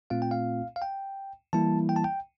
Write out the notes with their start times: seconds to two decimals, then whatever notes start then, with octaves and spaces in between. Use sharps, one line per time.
0.10 A#2 A3 C4 F4 F5
0.22 G5
0.31 F5
0.76 F5
0.82 G5
1.53 E3 G3 A#3 E4 A5
1.89 G5
1.96 A5
2.04 G5